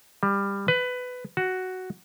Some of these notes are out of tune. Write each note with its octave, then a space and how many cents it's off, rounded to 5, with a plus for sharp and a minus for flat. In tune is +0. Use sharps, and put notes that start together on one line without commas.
G3 +20
B4 +15
F#4 +5